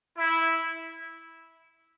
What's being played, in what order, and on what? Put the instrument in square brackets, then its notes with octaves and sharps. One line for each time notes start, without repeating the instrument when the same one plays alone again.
[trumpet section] E4